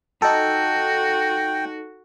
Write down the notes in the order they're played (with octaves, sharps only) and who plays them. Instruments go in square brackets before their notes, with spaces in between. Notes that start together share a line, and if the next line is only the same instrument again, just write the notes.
[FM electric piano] D#4 A4 [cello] F#4 [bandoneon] G5